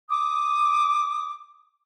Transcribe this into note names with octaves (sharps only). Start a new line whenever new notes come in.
D6 D#6